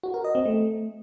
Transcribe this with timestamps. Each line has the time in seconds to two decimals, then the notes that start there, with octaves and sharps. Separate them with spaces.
0.03 F#4
0.14 A#4
0.24 D#5
0.35 C4
0.45 A3